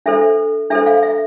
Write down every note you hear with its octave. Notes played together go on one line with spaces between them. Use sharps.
D4 A4 C5 E5
D4 A4 C5 E5
F5
E5